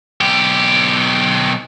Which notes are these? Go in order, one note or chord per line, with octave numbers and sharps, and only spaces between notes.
B1 G4